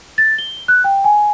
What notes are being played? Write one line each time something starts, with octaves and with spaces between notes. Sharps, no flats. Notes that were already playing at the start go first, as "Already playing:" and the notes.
A6
G7
F#6
G5
G#5